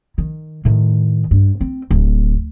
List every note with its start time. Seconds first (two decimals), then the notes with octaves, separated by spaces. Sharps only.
0.18 D#3
0.65 A2 D#3
1.31 G2
1.61 C4
1.91 D1